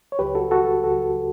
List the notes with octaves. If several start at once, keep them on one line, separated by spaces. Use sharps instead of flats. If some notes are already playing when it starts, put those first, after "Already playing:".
C#5
C#2 C#3 F#3 G4 B4
F#4 A4
F#4 A4
C#2 C#3 F#3 F#4 A4